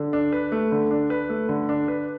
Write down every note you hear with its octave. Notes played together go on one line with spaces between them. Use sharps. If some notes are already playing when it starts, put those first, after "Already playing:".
Already playing: D3
D4
B4
A3
D3
D4
B4
A3
D3
D4
B4